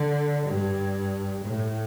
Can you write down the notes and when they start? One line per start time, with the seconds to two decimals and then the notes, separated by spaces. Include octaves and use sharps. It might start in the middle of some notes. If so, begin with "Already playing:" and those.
Already playing: D3
0.46 G2
1.45 A2